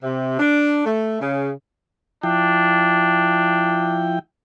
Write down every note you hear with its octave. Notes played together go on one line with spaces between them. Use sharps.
C3
D4
A3
C#3
F3 D4 E4 G5